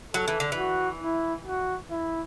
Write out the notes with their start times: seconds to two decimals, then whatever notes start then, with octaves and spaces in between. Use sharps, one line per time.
0.14 F#3 A4
0.28 E3
0.40 D3
0.52 E3
0.58 F#4
1.03 E4
1.46 F#4
1.91 E4